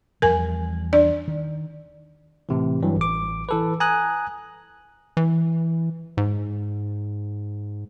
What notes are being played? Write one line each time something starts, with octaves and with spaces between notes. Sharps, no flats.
E2 F3 G3 A#4 G#5
D4 D5
D#3
A2 C3 E3
G2 E3 F#3
A1 D6
E3 A4 B4
G#5 A#5 D#6 F#6
E3
G#2